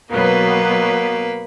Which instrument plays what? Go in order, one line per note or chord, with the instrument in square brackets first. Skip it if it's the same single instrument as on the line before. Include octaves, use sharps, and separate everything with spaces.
[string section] B2 F#3 B3 [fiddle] A#3 B4